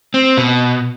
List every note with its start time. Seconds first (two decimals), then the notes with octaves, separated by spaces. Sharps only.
0.14 C4
0.37 B2